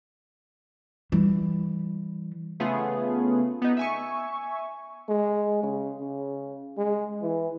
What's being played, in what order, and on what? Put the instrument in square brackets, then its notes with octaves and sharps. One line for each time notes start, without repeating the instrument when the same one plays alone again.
[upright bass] E3 G3
[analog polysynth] C#3 A3 B3 F4 G#4
B3 D#4
E5 G#5 C#6
[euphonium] G#3
C#3
C#3
G#3
E3